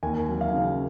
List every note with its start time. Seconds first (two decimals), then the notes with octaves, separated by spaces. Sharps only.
0.03 D#2 G#5
0.29 F#3
0.41 F5
0.54 C#3